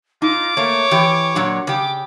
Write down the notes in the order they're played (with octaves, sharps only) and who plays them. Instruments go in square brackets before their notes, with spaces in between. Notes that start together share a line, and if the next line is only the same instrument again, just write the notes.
[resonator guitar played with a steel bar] D#4 [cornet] F4 [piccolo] D6
[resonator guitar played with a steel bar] A3 A#3 [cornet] C#5
[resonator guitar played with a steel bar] E3 G4
A#2 F#3 D4
[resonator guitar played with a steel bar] C#3 G4 [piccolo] D6